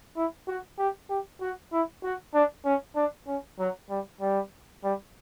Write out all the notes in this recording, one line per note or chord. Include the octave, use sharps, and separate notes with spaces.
E4
F#4
G4
G4
F#4
E4
F#4
D4
C#4
D4
C#4
F#3
G3
G3
G3